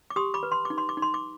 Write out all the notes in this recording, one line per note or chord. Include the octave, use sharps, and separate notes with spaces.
D6
G4 C6 D#6
B5 D6
B4
C6
D6
D#4
C6
D6
D#4
C6
D6